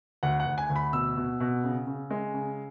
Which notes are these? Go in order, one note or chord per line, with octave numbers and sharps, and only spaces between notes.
D2 F#5
F#5
D2
G#5
D2
B5
B2 E6
B2
B2
C#3
C#3
G#3
C#3